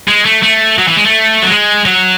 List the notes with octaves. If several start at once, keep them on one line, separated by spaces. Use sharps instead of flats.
G#3
A3
A3
F#3
E3
G#3
A3
F#3
G#3
F#3